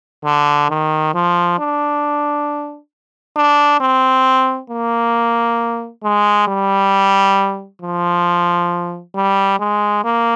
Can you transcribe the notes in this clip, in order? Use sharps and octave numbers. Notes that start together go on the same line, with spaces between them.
D3
D#3
F3
D4
D4
C4
A#3
G#3
G3
F3
G3
G#3
A#3